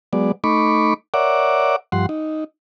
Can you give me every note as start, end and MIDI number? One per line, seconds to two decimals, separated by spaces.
0.13 0.32 54
0.13 0.32 56
0.13 0.32 59
0.13 0.32 74
0.44 0.94 57
0.44 0.94 63
0.44 0.94 83
0.44 0.94 85
0.44 0.94 86
1.14 1.76 70
1.14 1.76 73
1.14 1.76 74
1.14 1.76 76
1.14 1.76 78
1.14 1.76 86
1.92 2.06 43
1.92 2.06 53
1.92 2.06 78
1.92 2.06 84
2.09 2.44 63